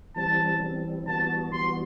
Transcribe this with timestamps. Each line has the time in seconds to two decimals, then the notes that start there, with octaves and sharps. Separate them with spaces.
0.16 E3 G3 C4 A5
0.62 E3 G3 C4
1.07 E3 G3 B3 F#4 A5
1.52 E3 G3 B3 F#4 C6